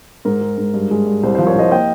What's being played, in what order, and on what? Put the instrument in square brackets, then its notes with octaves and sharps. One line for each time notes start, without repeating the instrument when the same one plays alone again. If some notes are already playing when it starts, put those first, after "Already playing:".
[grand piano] G#2 A#4
G#3
G#2
G2
G#3
G2
C2 C5
C5
F3
A#4 C#5
C2 C5 D#5
A#3 D#5 G5